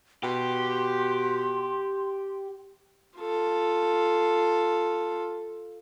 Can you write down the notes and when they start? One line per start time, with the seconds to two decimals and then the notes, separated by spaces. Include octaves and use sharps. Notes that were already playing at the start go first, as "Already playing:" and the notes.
0.23 B2 G4 C6
3.19 F4 A4